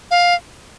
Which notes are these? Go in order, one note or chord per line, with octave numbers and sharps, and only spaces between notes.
F5